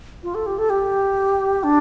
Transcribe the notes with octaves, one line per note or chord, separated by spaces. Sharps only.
F4
A4
G4
A4
G4
D4